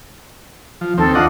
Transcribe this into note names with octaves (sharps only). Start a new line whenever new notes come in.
F3
D#2 C4 A4
D4 F4 D#5 F#5